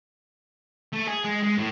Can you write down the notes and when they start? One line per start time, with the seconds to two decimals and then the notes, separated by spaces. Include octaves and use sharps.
0.92 A3
1.07 G#4
1.24 G#3
1.43 G#3
1.58 A2